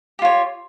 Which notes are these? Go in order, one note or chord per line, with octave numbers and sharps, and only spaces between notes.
F4 G4 C#5